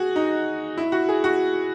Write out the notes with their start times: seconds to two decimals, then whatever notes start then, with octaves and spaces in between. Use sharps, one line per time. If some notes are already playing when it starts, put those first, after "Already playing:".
Already playing: F#4 G#4
0.16 D#4
0.78 E4
0.92 F#4
1.09 G#4
1.24 F#4